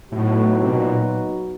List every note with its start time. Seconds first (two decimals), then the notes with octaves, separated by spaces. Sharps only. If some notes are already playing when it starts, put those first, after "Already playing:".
0.12 A2 F#3 B3 D#4 F#4
0.62 C3
0.69 B2
0.77 A#2